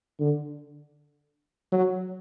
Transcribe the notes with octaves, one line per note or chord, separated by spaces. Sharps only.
D3
F#3